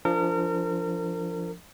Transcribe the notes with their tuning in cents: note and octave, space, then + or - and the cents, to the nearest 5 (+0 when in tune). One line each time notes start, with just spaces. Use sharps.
F3 -15 D4 +0 A#4 -35